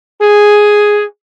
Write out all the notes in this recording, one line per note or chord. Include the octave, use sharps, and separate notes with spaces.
G#4